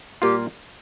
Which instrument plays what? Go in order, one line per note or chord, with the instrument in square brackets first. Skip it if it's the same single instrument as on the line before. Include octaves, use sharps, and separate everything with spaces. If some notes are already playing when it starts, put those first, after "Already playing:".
[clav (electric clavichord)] A#2 G3 A#3 F4 [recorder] G4